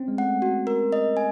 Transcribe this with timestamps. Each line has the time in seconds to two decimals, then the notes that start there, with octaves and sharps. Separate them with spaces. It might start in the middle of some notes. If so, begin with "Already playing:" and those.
Already playing: C4 C#4
0.08 G#3
0.17 A3 F#5
0.42 F#4
0.67 A#4
0.92 D#5
1.17 G#5